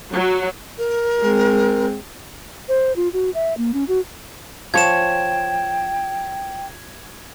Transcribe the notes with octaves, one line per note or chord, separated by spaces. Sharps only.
F#3
A#4
G#3 C4
C5
F4
F#4
E5
A#3
C#4
F#4
F3 C#5 G5 G#6 E7